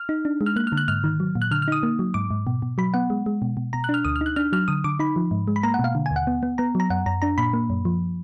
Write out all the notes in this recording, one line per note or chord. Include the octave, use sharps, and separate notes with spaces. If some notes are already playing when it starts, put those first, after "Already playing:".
Already playing: F6
D#4
D4
G#3
F6
A#3 F#6
F6
D3
F#6
G#2 F6
D#3
F#3
A#2
F#6
D3 F6
F6
D#4 D#6
A#3
F#3
G#2 D6
G#2
B2
B2
F#3 B5
B3 F#5
G#3
G#3
B2
B2
B2 A#5
F#6
D4
F6
D2 D#6
F6
D#4
F#6
D4 F6
F#3 F6
D3 D#6
D3 D6
D#4 B5
F3
G#2
G#3
B5
A#3 A#5
F#5
B2
F5
D3
G#5
D#2
F#5
B3
B3
B3 A#5
F#3 A#5
F#2 F#5
F#2 A#5
D4 A#5
A#2 B5
A#3
F#2
F3